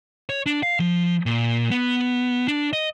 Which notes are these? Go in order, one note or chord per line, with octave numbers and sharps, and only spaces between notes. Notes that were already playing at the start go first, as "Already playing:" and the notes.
C#5
D4
F5
F3
A#2
B3
D4
D#5